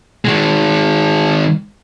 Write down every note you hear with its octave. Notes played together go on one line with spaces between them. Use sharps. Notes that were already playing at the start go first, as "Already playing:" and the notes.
D#3 G#3